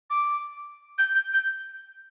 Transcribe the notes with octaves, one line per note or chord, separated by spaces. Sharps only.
D6
G6
G6
G6